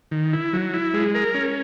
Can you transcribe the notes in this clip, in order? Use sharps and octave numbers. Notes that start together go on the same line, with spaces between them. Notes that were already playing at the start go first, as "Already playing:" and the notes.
D#3
E4
F#3
E4
G#3
A#4
C#4